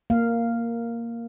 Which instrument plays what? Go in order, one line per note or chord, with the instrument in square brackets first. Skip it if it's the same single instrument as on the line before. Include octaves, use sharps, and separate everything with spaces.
[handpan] A#3 F5